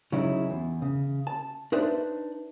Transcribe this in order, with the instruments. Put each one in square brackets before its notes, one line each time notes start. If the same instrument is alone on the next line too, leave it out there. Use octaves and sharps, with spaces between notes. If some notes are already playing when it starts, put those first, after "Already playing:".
[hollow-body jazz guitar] C#3 F#3 C#4 D#4 E4
E2
C#3
A5
D4 D#4 B4 C5 D5 E5